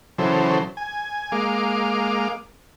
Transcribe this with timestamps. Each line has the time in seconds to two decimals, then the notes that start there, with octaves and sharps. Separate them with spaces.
0.18 C#3 E3 F#3 A4 C5
0.77 G#5
1.32 G#3 A#3 F5 D6